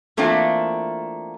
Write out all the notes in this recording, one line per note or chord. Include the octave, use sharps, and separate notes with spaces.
E3 A3 A#3 C4 D4 F4